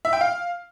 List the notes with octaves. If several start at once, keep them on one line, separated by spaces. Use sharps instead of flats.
E5
G5
F5